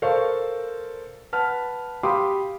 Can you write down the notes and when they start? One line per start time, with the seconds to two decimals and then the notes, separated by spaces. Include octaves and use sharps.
0.02 A4 A#4 C5 D5 F5 C#6
1.33 B4 F#5 A5 F6
2.03 G4 F5 B5 C6 D6 D#6